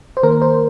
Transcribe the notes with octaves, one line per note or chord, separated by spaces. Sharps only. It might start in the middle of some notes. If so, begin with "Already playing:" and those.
C5
D#3 A#3 A#4
C5